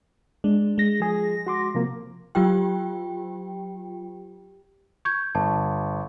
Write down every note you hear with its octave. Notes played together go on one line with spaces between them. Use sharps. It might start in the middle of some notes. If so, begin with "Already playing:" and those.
G#3 D4
G#3 A#6
F3 G#4
F#4 C6 D6
C3 F3 A#3
F#3 F4 G4 G5
C#6 G6 G#6
G1 A5